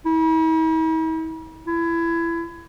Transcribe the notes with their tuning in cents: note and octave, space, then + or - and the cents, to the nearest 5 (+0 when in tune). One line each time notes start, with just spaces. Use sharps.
E4 -45
E4 +25